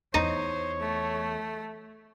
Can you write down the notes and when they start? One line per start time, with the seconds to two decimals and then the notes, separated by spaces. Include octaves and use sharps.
0.14 E2 D#4 C5 C#5
0.80 A3